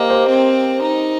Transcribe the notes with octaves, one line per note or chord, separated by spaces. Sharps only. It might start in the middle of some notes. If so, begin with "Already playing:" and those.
Already playing: A#3 G4 A#4 C5 D#5
G4 C5
C4
D#4